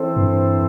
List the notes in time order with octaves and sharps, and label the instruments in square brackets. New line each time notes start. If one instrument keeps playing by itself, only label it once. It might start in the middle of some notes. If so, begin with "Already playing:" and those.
Already playing: [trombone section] E3 C4 A4 C5
[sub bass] G2